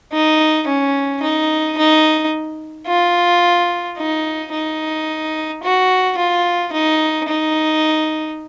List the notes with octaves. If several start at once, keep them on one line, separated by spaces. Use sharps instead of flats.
D#4
C#4
D#4
D#4
F4
D#4
D#4
F#4
F4
D#4
D#4